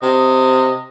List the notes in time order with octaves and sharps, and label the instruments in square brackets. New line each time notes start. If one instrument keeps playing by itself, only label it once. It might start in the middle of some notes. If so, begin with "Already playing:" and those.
[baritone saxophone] C3 [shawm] D#5